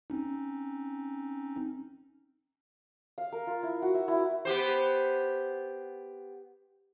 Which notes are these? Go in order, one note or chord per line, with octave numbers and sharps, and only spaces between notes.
C4 C#4 D#4
F5
A#4
F4
E4
F#4
E5
E4
B3 G4 C5